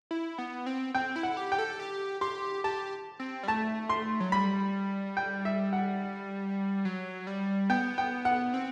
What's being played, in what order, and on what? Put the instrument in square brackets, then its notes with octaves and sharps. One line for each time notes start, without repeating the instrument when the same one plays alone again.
[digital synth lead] E4
B3
C4
[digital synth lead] C4 [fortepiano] G5
[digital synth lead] E4
[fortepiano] F#5
[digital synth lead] G4
[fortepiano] G5
[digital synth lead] A4
G4
[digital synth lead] G4 [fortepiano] C6
[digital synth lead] G4 [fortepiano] A5
[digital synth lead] C4
G3
[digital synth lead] A3 [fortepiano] A5
[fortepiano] C6
[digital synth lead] F#3
[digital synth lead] G3 [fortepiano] B5
[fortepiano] G5
E5
F#5
[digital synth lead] F#3
G3
[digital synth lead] B3 [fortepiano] G5
[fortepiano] G5
F#5
[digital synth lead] C4